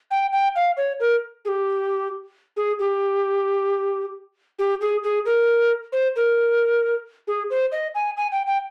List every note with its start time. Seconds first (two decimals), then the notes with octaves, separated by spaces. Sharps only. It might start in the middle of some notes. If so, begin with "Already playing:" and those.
0.11 G5
0.33 G5
0.56 F5
0.77 C#5
1.00 A#4
1.45 G#4
1.48 G4
2.57 G#4
2.79 G4
4.59 G4
4.81 G#4
5.03 G#4
5.25 A#4
5.92 C5
6.16 A#4
7.27 G#4
7.50 C5
7.72 D#5
7.95 G#5
8.17 G#5
8.32 G5
8.47 G5